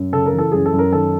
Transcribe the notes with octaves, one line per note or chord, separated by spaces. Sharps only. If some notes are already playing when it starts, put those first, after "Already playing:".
Already playing: F#2
C#3 A4
A#4
E3
A4
F#2 G#4
A4
F#2
A#4
D#3 A4